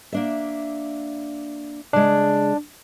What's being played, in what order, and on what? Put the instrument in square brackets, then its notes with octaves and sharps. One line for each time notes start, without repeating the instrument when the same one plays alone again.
[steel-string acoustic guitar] A#3 D4 E5
[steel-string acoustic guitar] C#3 G#3 [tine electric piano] D4